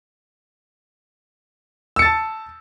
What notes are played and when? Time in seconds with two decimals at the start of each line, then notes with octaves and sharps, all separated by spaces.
1.96 E6
1.99 C#7
2.02 A6
2.05 A5